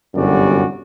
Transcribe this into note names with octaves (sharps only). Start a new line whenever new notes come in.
G1 C2 F#2 G3 F#4 D5